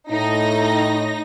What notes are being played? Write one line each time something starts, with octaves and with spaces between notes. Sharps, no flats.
A2 D#4 A#6